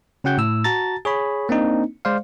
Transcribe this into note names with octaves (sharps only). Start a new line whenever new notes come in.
C#3 C#4 F#4 F#5 G5 G6
A2 E6
F#4 A5 A#5 A6
G#4 C#5 B5
A#3 C4 D4 D#4
G#3 C5 D5 F5